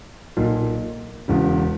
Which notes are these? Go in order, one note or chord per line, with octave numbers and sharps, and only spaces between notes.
B1 A#2 A#3
E1 E2 C#3